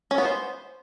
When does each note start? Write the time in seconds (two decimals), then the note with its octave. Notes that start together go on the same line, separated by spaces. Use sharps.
0.11 C#4
0.18 B3
0.25 C5